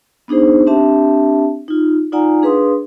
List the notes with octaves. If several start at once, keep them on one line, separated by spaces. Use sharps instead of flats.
B3 D4 D#4 G#4 C5
C4 D4 G4 E5 A5
D#4 F4
D#4 F4 D5 F#5 G#5 A#5
D4 G#4 B4 F5 C6 D#6